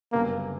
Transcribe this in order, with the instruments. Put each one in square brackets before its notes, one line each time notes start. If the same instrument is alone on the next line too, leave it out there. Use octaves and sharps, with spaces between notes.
[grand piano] F#1 F#2 D3 G3 B3 [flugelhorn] A#3